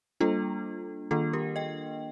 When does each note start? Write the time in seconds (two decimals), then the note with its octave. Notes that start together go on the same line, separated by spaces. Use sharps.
0.20 G3 A#3 D4 F4 A4
1.11 D#3 A#3 D4 F4 A4
1.33 G4 A#4
1.56 D#5 G5